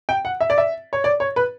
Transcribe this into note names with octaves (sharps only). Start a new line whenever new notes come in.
G5
F#5
E5
D5
E5
C#5
D5
C#5
B4